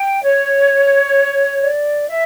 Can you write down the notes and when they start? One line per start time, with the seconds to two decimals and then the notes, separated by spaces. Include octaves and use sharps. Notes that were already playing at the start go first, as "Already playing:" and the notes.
Already playing: G5
0.25 C#5
1.62 D5
2.08 E5